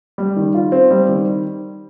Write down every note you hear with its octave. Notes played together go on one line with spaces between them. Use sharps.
G3
D#3
F4
C4
G3
D#3